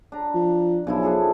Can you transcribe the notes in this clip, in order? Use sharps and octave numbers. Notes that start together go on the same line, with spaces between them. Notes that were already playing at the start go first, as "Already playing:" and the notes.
D4 A#5
F3
B1 C#3 F3 E4
D4 G#4 A4